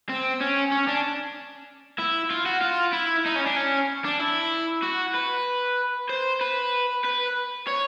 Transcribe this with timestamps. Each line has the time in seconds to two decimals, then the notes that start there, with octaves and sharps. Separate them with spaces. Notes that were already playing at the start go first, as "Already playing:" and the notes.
0.09 C4
0.41 C#4
0.72 C#4
0.88 D4
1.99 E4
2.30 F4
2.46 F#4
2.61 F4
2.93 E4
3.25 D#4
3.35 C#4
3.46 D4
3.56 C#4
4.05 D4
4.20 E4
4.83 F#4
5.15 B4
6.10 C5
6.41 B4
7.05 B4
7.68 C#5